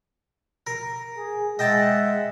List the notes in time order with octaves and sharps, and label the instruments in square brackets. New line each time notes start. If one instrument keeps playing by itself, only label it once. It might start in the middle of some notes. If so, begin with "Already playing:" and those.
[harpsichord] A#4
[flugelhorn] G#4
[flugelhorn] G#3 [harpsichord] D#5 G5 A5 [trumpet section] E5 F#5